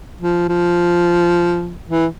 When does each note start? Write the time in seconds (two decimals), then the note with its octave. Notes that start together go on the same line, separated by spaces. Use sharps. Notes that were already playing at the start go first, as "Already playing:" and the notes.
0.21 F3
0.49 F3
1.89 E3